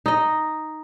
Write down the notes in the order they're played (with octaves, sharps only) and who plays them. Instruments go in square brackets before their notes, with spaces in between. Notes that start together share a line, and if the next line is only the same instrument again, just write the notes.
[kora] D#4 D#5